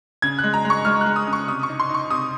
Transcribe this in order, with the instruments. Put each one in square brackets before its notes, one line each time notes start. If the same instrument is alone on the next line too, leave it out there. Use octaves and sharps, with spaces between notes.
[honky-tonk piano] C#3 G#6
G#3 F#6
A#5
G#3
C#6
G#3 F6
F#6
G#3
D#6
C#3
C#6
C3 D#6
C#6
D#4
C6
D#4
C#6
C3 D#6